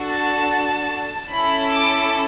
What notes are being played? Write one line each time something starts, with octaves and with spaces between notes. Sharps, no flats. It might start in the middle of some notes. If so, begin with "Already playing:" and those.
Already playing: D4 F#4 A4
A5
C#4 E4 A4 B5
D6